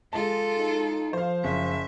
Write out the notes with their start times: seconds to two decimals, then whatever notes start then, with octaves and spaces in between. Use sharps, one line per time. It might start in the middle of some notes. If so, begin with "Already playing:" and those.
0.13 G#3 F4 A4 A5
0.58 D#4
1.13 F3 C5 F5
1.44 F#1 E5